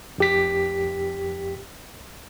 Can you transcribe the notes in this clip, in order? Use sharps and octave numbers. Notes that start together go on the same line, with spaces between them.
F2 G4 B6